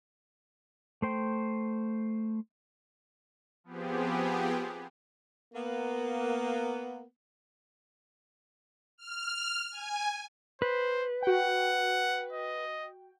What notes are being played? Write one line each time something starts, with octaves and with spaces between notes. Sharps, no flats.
A3 C5 G5
F3 B3 C4 G4 G#4
A#3 B3
F6
G#5
B4 C5
F#4 F#5 G5
D#5